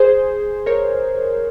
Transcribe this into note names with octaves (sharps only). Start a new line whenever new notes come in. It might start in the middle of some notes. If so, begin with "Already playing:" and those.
Already playing: G#4 C5
A#4 C#5